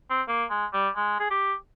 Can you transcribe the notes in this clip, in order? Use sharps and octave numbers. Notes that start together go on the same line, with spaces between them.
C4
A#3
G#3
G3
G#3
G#4
G4